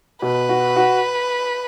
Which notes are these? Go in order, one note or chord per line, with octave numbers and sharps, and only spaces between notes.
B2 B4
F#4
F#4